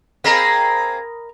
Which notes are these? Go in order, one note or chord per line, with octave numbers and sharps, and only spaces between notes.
A#3 C4 G#4 A#4 D#5 B5